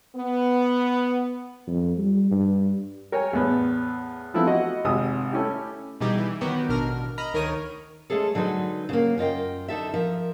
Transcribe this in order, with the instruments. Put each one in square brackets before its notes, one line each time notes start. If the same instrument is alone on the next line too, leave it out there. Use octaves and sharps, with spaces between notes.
[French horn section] B3
[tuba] F2
G3
G2
[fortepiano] A#4 C#5 G5 G#5
E2 A2 B3
E3 F3 A3 B3 C4 E4
F4 F#4 D#5 F#5
G#1 C3 D#6
A3 C#4 E4 G4
[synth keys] B2 E3 G3 D#4 G4 G#4
E3
D#3 F#3 B3 F#4 G4
A1 B2 D4 A#4 F6
D#5 A#5 B5 F6
D2 D#3 A#4 C#5 D#6 D#7
[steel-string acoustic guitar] G#3 A3 C#4 G#4 A4
D3 F#3 G#3 D#4 B4
C#3 A#3
F#2 F4 D#5 G5
D3 D#4 A4 E5
F3 A#4 E5